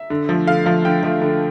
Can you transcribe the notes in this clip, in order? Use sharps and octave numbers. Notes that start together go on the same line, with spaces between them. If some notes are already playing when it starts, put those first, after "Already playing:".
Already playing: E5
D3
F3 A3
D3 F5
F3 A3 F5
D3 G5
F3 A3
D3